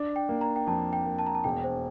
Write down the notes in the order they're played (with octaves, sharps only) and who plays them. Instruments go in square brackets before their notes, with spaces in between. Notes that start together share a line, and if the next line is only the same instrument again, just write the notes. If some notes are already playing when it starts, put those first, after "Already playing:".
Already playing: [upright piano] D4
[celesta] G5
[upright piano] A#3
[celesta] A#5
G5
[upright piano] F2 [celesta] A5
[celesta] G5
[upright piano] A#3
[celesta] A5
A#5
A5
[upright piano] E1 [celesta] G5
[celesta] C5